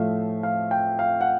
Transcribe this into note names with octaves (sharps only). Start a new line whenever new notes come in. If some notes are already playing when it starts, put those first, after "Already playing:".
Already playing: A2 F3 A3 E5 F5
F5
G5
F5
F#5